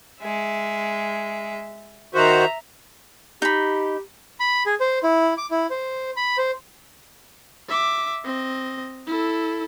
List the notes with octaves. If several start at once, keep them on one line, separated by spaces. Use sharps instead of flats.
G#3 E5
D#3 F#4 C5 E5 A#5
D#4 G4 B5
B5
G#4
C5
E4
D6
E4
C5
B5
C5
E5 D6
C4 D#5
E4 A4